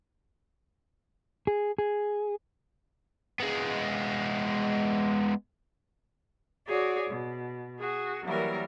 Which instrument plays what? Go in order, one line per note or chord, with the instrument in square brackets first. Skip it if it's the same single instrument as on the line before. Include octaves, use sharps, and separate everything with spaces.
[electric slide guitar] G#4
G#4
[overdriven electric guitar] G#3 B3
[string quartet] F#4 G#4 C#5 D5
B2
F#4 G#4
E3 F#3 G3 A#3 A#4